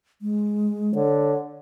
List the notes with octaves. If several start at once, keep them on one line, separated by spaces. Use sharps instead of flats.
G#3
D3 C#5